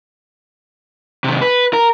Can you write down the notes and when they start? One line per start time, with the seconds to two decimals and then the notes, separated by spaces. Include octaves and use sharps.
1.24 C3 D#3
1.42 B4
1.73 A#4